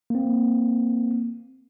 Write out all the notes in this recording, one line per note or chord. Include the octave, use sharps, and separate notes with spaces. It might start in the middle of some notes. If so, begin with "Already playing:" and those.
A#3 C4